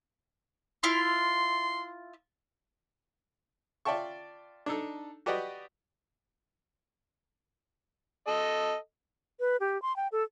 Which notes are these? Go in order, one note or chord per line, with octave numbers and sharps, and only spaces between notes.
E4 F4 C6
F4 D5 E5 G5 A5 C#6
D4 D#4 A4
F#4 G4 B4 D5 D#5 F#5
A4 D#5
B4
G4
C6
G5
A4